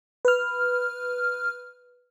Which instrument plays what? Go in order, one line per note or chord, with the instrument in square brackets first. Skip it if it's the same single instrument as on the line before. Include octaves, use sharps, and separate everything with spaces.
[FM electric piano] B4 F6